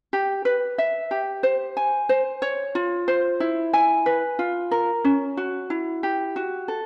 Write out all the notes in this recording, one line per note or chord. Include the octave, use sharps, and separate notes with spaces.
G4
B4
E5
G4
C5
G#5
C5
C#5
F4
C5
E4
G#5
B4
F4
A#4
C#4
F#4
E4
G4
F#4
A4